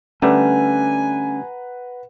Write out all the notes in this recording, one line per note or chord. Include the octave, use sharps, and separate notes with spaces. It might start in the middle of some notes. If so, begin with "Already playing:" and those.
D3 G3 A3 C#4 B4 F#5 G#5 A#5